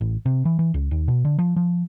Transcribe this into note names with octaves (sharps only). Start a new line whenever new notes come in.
A1
C3
E3
E3
C#2
D#2
B2
D3
F3
F3